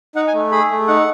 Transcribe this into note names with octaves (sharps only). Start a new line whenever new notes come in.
D#4 F#5
G#5
A3
G#4 B5
A3
D#4 F#5